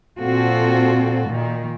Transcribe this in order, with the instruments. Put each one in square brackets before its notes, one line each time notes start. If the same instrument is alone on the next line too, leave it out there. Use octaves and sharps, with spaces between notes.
[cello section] A#2 C4 F4 F#4 A4
A#2 D#3